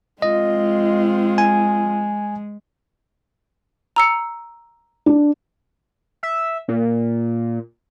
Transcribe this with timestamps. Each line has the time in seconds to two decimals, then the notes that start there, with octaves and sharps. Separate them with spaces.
0.22 G#3 C4 F4 D#5
1.38 G#5
3.96 A#5 E6 C#7
5.06 D4
6.23 E5
6.68 A#2